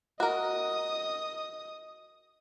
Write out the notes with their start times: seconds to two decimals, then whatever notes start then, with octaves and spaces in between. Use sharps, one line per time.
0.20 F#4 A#4 D#5 D#6